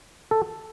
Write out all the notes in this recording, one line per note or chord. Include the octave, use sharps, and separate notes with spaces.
A4